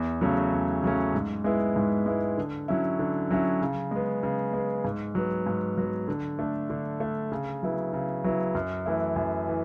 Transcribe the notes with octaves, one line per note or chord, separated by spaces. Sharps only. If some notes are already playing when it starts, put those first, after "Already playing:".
Already playing: E2
C#3 F#3 A3 C#4
E2
C#3 F#3 A3 C#4
G#2
G#3 B3 E4
G#2
G#3 B3 E4
D3
F#3 C#4 E4
D3
F#3 C#4 E4
C#3
G#3 B3
C#3
G#3 B3
G#2
F#3 B3
G#2
F#3 B3
D3
A3 D4
D3
A3 D4
C#3
F#3 B3 E4
C#3
F#3 B3 E4
F#2
E3 A3 E4
F#2
E3